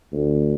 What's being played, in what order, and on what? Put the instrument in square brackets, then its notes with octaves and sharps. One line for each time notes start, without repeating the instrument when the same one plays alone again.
[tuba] D2